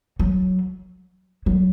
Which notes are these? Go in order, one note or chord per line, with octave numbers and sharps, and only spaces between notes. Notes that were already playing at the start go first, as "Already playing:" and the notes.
F#3
F#3